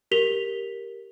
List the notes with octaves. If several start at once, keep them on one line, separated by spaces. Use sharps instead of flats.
G4 A#4 B6 F7 G7